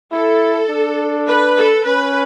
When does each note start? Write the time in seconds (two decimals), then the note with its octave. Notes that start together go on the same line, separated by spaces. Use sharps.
0.12 E4 A4
0.70 D4
1.28 B4
1.57 A4
1.86 C#4 B4